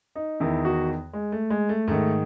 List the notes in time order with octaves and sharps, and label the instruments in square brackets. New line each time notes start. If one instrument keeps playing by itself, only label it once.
[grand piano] D#4
E2 D#3 E4
F#4
G#3
A3
G#3
A3
G#2 D#3 A3